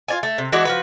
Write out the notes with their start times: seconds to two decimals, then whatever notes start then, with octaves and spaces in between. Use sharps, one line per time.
0.08 F4 D5 G#5
0.23 A3
0.38 C3
0.52 E3 G#3 D4 F#4
0.65 F3 F#4 B4